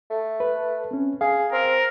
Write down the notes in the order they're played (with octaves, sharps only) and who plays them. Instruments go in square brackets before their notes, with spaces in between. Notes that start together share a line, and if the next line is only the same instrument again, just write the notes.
[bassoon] A3
[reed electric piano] B4
C4 C#4
[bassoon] G#4 [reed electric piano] F5
[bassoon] C4 [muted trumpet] A#4